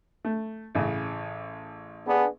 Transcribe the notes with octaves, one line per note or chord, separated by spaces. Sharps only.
A3
A1 C#3
B3 D4 G#4